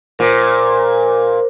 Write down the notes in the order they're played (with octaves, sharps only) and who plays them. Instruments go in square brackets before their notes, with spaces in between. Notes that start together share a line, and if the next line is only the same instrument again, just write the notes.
[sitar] A#2 [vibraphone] A#4 C5